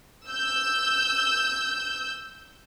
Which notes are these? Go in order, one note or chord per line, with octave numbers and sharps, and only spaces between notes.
E6 G6